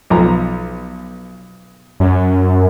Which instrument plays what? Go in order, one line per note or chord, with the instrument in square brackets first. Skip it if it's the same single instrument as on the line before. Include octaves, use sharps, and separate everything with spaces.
[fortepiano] B1 F3 A#5
[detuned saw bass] F#2